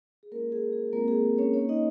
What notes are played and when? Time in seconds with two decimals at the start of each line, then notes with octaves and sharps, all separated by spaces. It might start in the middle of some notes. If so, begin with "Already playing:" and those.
0.23 G#4
0.32 G#3 A#3 C#4 F4 A#4
0.52 G#4
0.72 G#4
0.93 G#3 A#3 C4 F4 A#4
1.08 G#4
1.38 C#4 C#5
1.53 A#3 C#4 D#4 C#5
1.69 D#4 D#5